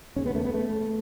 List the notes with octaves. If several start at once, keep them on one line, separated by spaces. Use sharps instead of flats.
E1 D#2 C#3 C#4
B3
A3
B3
A3